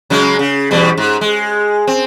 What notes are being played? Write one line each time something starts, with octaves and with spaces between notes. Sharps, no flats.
C#3 F#3 G#3
C#3
E2 B2 G3
G#2
G#3
C4